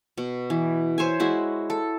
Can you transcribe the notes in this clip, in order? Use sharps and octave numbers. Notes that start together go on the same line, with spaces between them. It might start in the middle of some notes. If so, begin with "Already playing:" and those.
B2
E3
C5 C#5 E5 G#5
G#3 E4 F#4
A4